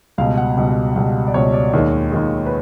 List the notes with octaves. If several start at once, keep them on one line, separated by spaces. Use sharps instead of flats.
C#2 B2 G3 F5
F#5
C#2 B2 G3
C#2 B2 G3
D5
C#2 B2 G3 C#5
D5
D#2 D#3 G#3 C#5
D#2 D#3 G#3
B4